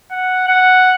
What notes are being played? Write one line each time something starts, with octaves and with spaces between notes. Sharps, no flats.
F#5
F#5